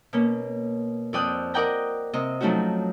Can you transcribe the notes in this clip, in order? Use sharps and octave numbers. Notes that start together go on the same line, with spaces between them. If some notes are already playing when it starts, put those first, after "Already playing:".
B2 A#3 C#4
F2 C4 D5 G5 D#6 F#6
A#4 D5 D#5 F#5 G5 A#5
C3 C4 D#5
F3 F#3 A3 C#4 D#4 F#4